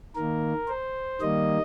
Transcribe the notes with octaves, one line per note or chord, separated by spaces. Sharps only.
D#3 A#3 A#4
C5
D#3 G3 A#3 D#5